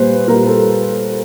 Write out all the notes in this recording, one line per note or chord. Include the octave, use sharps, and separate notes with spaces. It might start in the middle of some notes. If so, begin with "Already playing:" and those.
Already playing: A#2 G3 B4 C5
A#2 G3 A#4
A4